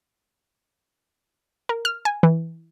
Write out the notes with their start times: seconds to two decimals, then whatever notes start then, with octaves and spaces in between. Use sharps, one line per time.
1.69 A#4
1.85 F6
2.05 G#5
2.23 E3